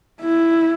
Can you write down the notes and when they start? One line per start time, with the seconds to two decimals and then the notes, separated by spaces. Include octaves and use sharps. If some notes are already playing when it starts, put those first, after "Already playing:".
0.22 E4